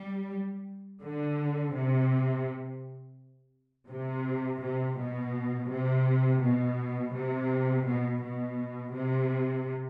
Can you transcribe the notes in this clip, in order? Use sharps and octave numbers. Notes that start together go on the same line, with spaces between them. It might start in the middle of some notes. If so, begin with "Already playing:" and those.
Already playing: G3
D3
C3
C3
C3
B2
C3
B2
C3
B2
B2
C3